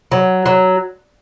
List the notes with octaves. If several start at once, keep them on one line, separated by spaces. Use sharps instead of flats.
F#3
F#3